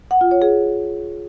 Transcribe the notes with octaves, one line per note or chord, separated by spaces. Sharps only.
F#5
F4
C#5
G#4